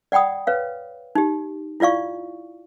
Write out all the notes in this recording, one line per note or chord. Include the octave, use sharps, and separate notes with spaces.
D5 F#5 G5 B5 D#6
B4 C#5 F5
D#4 G4
E4 F4 D5 F5 C#6